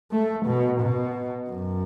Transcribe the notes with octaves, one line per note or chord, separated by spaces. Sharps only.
A3
B2
B2
F#2